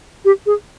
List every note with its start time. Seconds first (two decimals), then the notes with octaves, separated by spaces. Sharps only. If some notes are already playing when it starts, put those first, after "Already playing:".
0.25 G4
0.46 G#4